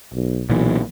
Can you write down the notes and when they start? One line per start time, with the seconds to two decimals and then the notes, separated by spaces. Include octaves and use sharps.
0.14 B1
0.50 B1 A#2 E3